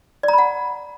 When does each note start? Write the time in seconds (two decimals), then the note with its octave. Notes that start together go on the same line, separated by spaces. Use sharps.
0.23 D5
0.28 A#5
0.33 B5
0.38 F#5